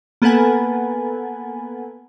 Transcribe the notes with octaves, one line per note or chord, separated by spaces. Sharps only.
A#3 B3 A4 B4 F#5 G#5